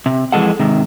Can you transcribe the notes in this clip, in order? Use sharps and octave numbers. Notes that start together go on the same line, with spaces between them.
C3
F2 E3 F3 G#3 A4 F#5
G#2 C3 D#3